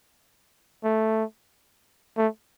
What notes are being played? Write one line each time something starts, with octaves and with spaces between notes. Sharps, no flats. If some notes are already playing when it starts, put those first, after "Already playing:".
A3
A3